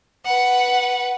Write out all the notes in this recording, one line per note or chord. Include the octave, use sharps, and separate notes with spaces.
B4 F#5